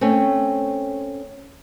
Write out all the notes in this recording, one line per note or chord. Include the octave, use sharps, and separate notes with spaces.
A3 C4 C#4